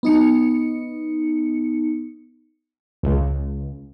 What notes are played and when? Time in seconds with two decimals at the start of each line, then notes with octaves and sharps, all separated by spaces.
0.03 B3 D#4 C#7
3.03 C#2